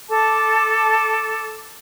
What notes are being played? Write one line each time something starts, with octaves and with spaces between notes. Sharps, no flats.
A4 A5 D6